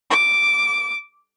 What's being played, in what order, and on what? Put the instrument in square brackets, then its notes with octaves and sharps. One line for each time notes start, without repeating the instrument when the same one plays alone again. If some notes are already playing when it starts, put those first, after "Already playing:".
[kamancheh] D6